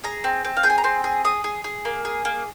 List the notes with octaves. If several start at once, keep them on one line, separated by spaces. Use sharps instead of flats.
G#4 A#5
C4
C4
F5
G#4 G5
G#5
A#5
C4 C6
G#4
G#4 D#6
G#4
G#4
A#3
G#4
A#3